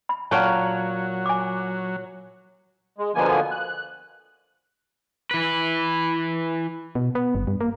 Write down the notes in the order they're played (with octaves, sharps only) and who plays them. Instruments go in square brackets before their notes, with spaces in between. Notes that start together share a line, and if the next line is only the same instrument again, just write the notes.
[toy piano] B5
[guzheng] A#2 A#3 G5 [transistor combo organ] F#3 [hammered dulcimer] C#5 F#5 [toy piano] A5
[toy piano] G#5 D6
[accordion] G#3
B2 D3 F3 A#3 B3 G#5
F#6
[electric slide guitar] E3 B4
[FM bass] B2
B3
G1
G2
A#3